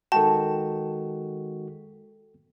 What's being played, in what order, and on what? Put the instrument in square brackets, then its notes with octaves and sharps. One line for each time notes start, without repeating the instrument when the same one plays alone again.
[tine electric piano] D#3 G#3 F#4 [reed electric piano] A4 G5 [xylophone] A5